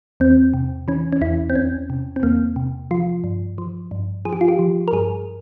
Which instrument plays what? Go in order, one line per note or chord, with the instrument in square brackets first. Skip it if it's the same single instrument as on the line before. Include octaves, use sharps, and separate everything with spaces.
[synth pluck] E2 C4
C3
E3 C#4
C#4
E2 E4
C4
E2 C#4
C3
C4
E2 A#3
C3
F3 F4
G2
F3
G2
F3 G#4
G4
F4
G4
F3
A#4
G2 G#4